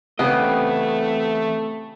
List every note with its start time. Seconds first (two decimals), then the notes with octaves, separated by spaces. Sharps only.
0.19 C#3 E3 A3 B3 C4 G4 D#5